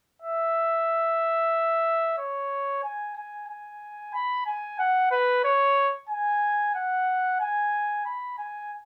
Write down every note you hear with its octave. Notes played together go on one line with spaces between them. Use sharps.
E5
C#5
G#5
G#5
G#5
B5
G#5
F#5
B4
C#5
G#5
F#5
G#5
B5
G#5